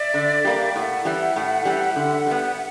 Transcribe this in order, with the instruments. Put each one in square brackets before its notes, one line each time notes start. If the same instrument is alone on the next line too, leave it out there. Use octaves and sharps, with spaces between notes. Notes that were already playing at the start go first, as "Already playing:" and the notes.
Already playing: [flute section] D5 E5
[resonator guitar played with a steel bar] D3
G3 A#3
[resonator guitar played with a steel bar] A2 [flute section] E5 F#5
[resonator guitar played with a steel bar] E3 G3
A2
E3 G3
D3
G3 B3